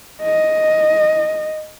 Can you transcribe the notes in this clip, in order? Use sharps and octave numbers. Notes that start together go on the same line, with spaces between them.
D#5